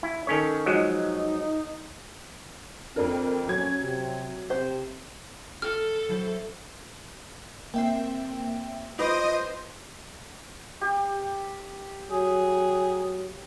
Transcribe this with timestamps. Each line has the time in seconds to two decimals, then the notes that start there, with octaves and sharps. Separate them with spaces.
0.03 E4
0.27 D#3 C#4 A4 C#5
0.66 F3 F#3 G#3 D#4
2.96 F2 C4 D4 A#4
3.47 F#3 C#4 G#6
3.82 C3
4.50 C3 C5
5.62 A4 F6
6.09 F#3 E4 C5
7.74 A#3 C4 E5 G5
8.99 F4 B4 C5 D#5 D6 A#6 D#7
10.81 G4
12.11 F#3 G#4